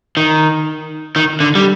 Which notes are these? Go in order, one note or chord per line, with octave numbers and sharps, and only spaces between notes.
D#3
D#3
D3
G3